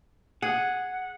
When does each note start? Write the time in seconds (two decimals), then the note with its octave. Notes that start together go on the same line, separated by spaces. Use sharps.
0.42 G#4 F#5